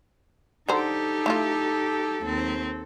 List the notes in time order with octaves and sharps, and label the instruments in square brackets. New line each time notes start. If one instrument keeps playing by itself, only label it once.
[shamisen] D3 C5 A#5 [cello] D#4 G4 [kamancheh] A4
[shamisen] A3 E4 F4
[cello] D#2 C4